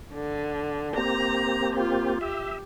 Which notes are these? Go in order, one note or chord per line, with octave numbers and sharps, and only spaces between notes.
D3
A#3 C4 G4 A#5
F4
G4 E5